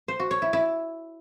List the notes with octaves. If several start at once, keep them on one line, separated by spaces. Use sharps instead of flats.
C5
F#4
C#5
E4
E4